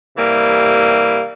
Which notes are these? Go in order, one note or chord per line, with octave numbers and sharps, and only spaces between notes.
C3 E3 G3 A#3